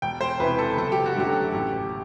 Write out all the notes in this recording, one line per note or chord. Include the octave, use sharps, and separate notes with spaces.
E1 G5
C5
E2 C3 E3 B4
A4
F#1 A4
G4
F#4
F#2 D3 F#3 A3 G4
A1